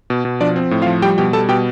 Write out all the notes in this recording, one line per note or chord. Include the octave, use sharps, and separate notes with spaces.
B2
B2
F3 D4 D5
C4
A2
F4 F5
F3
G3 G4 G5
B2 G4 G5
G3 A4 A5
B2 G4 G5